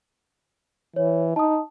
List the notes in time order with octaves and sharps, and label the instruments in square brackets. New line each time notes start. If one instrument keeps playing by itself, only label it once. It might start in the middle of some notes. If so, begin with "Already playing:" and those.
[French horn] E3 [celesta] C#5
[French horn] D#4 [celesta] A5 D#6